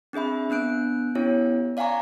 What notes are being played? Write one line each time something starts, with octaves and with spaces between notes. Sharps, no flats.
C4 D4 G#4 E5 B5
B3 D4 F#6 D7
B3 C#4 E4 G4 C#5
D5 F5 F#5 G#5 A#5 C#6